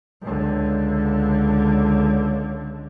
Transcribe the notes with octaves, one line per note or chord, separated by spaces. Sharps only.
C#2 D3